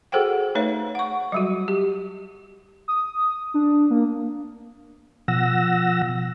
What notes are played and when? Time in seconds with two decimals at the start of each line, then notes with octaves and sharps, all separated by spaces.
0.12 F#4 G#4 A4 C5 F#5 G5
0.55 A3 D#4 B4 C#5 E5
0.95 F#5 C#6
1.32 F#3 G3 F#4
1.68 G4
2.88 D#6
3.54 D4
3.90 A#3
5.28 B2 F3 F#5 E6 A#6